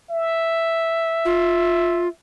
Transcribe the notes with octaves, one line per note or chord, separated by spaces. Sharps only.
E5
F4